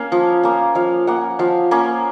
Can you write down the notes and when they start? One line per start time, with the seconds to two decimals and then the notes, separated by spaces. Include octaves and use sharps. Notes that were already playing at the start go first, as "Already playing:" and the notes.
Already playing: A#3 C#4 F5
0.12 F3
0.43 A#3 C#4
0.75 F3 F5
1.07 A#3 C#4 F#5
1.39 F3 F5
1.71 A#3 C#4